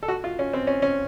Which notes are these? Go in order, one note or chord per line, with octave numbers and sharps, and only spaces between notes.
A4
F#4
F4
C#4
C4
C#4
C#4